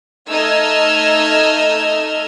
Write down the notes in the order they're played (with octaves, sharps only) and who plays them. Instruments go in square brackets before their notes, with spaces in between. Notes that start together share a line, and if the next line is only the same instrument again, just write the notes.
[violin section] A3 D#4 D#5 E6 F6 G#6